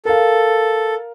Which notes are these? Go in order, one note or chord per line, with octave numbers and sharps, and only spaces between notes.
A4 A#4 F5